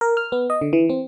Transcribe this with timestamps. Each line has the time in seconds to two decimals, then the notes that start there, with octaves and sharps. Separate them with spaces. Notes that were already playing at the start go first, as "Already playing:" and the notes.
0.01 A#4
0.17 F6
0.32 B3
0.50 D#5
0.61 D3
0.73 E3
0.90 C4